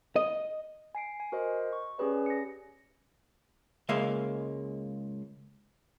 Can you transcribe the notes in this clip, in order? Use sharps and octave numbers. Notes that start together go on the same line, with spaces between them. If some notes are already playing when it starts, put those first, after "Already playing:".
D#5
G#5 C7 D7
G#5
F#4 A#4 C5 D#5
C#6
C#4 G4 G#4 B4 D5
A#6 C#7
C#2 G#3 A#3 E5 F5